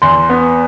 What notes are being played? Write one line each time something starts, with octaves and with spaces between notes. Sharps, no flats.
E2 C6
B3